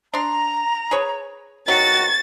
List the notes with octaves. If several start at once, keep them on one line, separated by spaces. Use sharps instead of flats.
D4 A#5 C6
G#4 B4 C#5
D#3 F#3 F#4 A6